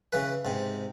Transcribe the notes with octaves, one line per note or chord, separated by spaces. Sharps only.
C#3 E3 B4
G#2 C3